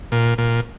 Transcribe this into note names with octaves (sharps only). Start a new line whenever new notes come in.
A#2
A#2